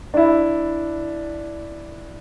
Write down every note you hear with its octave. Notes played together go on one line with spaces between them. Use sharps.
D4 E4